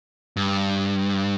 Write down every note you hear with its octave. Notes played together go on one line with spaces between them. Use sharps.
G2